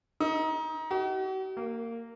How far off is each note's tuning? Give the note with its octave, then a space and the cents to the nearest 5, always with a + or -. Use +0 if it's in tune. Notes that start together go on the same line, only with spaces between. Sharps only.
D#4 +25
F#4 +45
A#3 -15